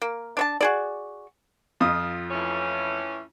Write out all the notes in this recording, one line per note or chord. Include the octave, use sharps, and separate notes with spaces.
A#3
D4 C#5 A5
F#4 G#4 D5
F2 F4 D#6
A2 E3 C#4